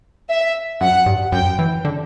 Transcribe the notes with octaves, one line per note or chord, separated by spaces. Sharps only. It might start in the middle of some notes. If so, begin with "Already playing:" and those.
E5
F#2 F#5
G2
F#2 G5
E3
D3